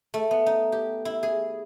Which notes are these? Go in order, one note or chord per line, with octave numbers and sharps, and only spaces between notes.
A3
B3
D#4
G4
E4
G#4